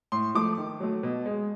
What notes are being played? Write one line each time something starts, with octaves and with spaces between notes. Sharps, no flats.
A2 C6
F3 A3 D6
D#3
F#3 A3
B2
G#3